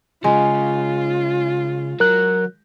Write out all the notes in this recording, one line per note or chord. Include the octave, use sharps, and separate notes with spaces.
C#3 G#3 F4
F#3 A#4 F#6